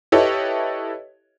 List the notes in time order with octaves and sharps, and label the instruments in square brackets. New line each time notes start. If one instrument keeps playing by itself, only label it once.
[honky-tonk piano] E4 G4 A4 B4 C#5 D#5